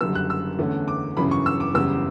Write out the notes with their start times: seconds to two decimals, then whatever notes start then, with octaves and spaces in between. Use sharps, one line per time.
0.01 F#1 F#2 D3 G3 E6
0.15 F#6
0.30 E6
0.59 E2 D3 A3 C#4
0.88 D6
1.17 G1 F#2 C#3 E3 B5
1.31 C#6
1.46 E6
1.60 D6
1.74 F#1 E2 C#3 G3 E6